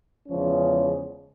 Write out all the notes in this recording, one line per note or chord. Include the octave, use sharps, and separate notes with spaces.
E2 C#3 F3 G#3 C#4